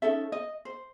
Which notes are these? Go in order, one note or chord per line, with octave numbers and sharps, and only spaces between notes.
C#4 D#4 A4 E5
D#5
C5